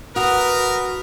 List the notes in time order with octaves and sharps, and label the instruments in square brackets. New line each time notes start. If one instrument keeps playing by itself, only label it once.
[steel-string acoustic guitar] F#4 [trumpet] A#4 [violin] B4 [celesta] F#5 D#6 F7